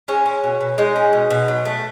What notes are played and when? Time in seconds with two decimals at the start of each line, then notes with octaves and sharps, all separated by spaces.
0.08 G#3 C#4 C#5
0.26 C#4
0.44 B2
0.61 B2
0.78 G#3 D#4 D#5
0.96 C#4
1.13 B2
1.30 B2
1.48 F#3
1.65 A3